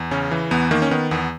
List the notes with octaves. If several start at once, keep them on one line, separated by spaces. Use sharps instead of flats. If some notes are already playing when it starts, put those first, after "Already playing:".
Already playing: E2
C#3 C#4
E3
E2 B3
D#3 A#3
C#4
D#3 B3
E2 B3